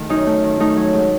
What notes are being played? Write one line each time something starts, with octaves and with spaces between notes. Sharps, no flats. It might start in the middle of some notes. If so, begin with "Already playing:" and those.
Already playing: D#3 A3
F#2 D#4
A3
D#3
A3 D#4
F#3
G#2